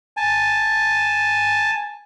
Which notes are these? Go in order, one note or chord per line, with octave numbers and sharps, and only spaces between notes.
G#5 A5